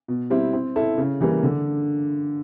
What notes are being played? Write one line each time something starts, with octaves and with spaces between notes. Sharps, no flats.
B2
G3 C4 E4
C4
E4 A4
C#3
E3 G3 A#3
D3